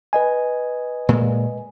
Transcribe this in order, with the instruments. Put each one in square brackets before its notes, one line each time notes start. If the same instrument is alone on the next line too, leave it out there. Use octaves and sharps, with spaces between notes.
[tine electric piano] B4 D#5 G#5
[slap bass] A#2 G#3